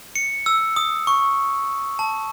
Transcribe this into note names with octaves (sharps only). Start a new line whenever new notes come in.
C#7
E6
D#6
C#6
A5